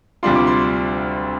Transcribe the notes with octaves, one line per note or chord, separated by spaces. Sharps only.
D2 C3 G3 D4 F4 C6
D6
C6